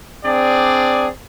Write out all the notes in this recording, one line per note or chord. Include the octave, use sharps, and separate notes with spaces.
C4 D4 G#4 D5